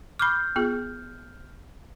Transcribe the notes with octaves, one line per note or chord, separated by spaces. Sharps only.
B5 C#6 D6 F6 G6 C7
B3 F4 G#4